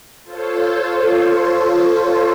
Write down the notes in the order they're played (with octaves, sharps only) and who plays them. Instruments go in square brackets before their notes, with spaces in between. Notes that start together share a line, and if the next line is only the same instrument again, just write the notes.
[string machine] F4 A4 C5 C#5